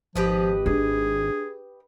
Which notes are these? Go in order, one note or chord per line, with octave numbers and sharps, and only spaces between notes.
G#1 F3 G4 B4 D#5
D4 G#4